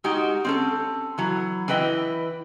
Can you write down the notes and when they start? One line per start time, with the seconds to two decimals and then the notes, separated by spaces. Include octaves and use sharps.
0.04 G#3 D#4 F#4 G4
0.45 C4 C#4 A4
1.18 E3 F#3
1.68 E3 E4 B4 D#5 G5